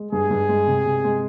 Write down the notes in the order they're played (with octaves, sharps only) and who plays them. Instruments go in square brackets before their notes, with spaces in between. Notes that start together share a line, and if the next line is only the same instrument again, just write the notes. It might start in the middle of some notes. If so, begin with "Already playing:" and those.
Already playing: [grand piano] G#3
[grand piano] G2 [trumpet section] G#4
[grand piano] G2
G#3
C3
C3
G#3